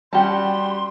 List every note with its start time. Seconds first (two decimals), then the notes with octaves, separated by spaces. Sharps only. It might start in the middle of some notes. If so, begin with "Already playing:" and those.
0.13 G3 C#4 F#4 G4 A5 C6